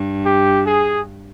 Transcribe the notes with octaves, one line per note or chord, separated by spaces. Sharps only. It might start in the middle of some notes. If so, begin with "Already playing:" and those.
Already playing: G2
G4
G#4